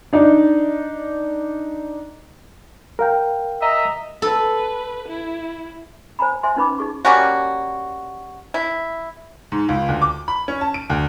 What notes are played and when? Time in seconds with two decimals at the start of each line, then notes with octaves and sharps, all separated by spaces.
0.13 D4 D#4 D5
2.99 A#4 F5 G5
3.62 D#5 E5 A#5
4.22 A4 B4
5.08 E4
6.19 C5 G#5 A#5 B5
6.43 C5 E5 G#5 C6
6.56 C#4 D#4 B4 B5 D6
6.79 D#4 G#4 C#6
7.05 G3 A#3 C#4 F#4
8.54 E4
9.52 G#2
9.69 C#2
9.88 D2
10.02 D6
10.28 B5
10.48 C#4
10.61 A5
10.74 D7
10.90 D2